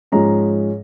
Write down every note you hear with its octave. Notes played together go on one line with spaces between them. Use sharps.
G#2 F3 G#3 C#4 A#5